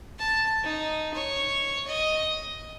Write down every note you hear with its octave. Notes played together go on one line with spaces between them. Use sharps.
A5
D#4
C#5
D#5